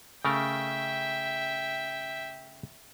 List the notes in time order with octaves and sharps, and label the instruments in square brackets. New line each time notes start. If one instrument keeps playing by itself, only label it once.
[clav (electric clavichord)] C#3 A3 A#4 [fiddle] E5 G5